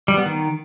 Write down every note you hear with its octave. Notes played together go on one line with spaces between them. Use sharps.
G3
B3
D#3